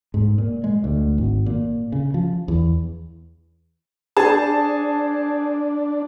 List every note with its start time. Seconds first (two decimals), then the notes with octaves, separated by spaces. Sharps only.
0.14 G#2
0.38 A#2
0.64 G#3
0.84 D2
1.18 G#1
1.46 A#2
1.92 C#3
2.14 F3
2.48 E2
4.17 D4 G#4 C5 A5